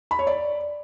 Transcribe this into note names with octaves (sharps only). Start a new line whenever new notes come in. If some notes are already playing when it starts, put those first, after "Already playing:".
B5
C#5
D5